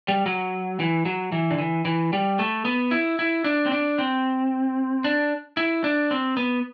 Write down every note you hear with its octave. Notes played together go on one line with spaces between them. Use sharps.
G3
F#3
E3
F#3
E3
D3
E3
E3
G3
A3
B3
E4
E4
D4
C4
D4
C4
D4
E4
D4
C4
B3